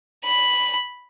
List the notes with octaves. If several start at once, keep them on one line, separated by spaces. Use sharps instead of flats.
B5